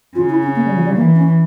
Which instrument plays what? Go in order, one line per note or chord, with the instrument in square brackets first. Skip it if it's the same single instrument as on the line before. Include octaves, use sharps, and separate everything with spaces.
[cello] C#3 [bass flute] F4
[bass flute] E4
C#4
A#3
G3
F3
G3
[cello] E3 [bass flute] A#3
[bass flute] C#4